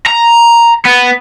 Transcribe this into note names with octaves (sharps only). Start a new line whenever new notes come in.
A#5
B3